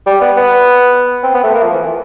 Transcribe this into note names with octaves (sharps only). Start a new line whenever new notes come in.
G3
B3
B3
C4
B3
A3
A#3
F3
E3